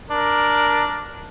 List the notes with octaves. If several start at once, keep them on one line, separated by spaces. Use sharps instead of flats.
D4 A#4